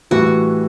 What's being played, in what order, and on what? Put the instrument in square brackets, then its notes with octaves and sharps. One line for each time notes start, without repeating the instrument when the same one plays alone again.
[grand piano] A2 E3 G3 [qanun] F#4